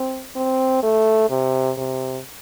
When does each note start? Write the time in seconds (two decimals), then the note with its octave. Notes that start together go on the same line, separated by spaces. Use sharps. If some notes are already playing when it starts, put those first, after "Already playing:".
Already playing: C4
0.36 C4
0.83 A3
1.30 C3
1.77 C3